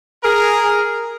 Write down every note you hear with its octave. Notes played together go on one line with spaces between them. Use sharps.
G#4 A#4